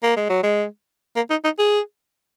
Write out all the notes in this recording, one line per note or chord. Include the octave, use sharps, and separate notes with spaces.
A#3
G#3
F#3
G#3
A#3
D#4
D#4
G#4